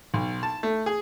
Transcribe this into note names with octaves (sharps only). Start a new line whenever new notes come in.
B1
A5
A3
G#4